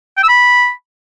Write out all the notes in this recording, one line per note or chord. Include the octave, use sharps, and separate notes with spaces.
G5
E6
B5